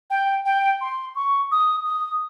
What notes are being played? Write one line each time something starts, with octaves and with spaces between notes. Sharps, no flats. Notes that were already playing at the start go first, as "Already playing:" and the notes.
G5
G5
C6
C#6
D#6
D#6